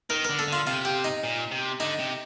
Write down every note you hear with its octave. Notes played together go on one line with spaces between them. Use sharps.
D#3 A#4
D3 A#4
A4
D3 F4
C3 F4
G4
D#4
A#2
C3
D3 D#4
C3